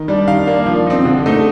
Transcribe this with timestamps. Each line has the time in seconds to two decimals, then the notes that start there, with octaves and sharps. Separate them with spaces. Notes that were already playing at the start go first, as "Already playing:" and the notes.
Already playing: D#3
0.08 G3 D4
0.28 D#3 F5
0.47 A#3 D4
0.66 F3
0.87 C4 D#4
1.05 D3
1.26 A3 D#4